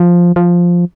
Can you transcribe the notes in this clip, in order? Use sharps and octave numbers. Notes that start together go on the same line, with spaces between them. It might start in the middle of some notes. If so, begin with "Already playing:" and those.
Already playing: F3
F3